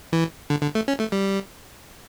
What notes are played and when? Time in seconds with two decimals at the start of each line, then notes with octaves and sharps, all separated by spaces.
0.13 E3
0.50 D3
0.63 D3
0.75 A3
0.88 C#4
1.00 A3
1.12 G3